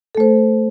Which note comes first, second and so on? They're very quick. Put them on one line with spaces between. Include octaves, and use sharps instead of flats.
A4 A3 C5